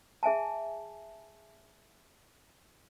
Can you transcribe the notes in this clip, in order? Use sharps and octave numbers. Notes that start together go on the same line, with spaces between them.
G#4 E5 G#5 A5